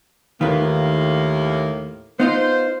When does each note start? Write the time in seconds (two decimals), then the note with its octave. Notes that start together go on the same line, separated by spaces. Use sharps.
0.41 D#2 A2 D#3 A#3 F4 B4
2.20 B3 D#4 F4 C5